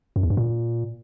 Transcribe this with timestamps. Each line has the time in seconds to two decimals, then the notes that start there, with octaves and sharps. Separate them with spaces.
0.16 F#2
0.23 E2
0.30 G2
0.37 A#2